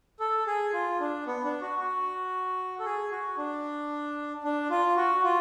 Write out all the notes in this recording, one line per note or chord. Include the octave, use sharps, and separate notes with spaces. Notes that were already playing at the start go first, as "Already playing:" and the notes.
A4
G#4
F4
D4
B3
D4
F#4
F#4
A4
G#4
F#4
D4
D4
F4
F#4
F4